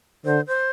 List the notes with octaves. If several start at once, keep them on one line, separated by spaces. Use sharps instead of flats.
D3 C5
C5